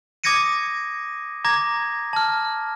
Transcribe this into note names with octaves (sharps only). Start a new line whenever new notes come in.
D6 D#6 G#6 A#6 C#7 D#7
A#5 D6 G#6 A#6
A5 F6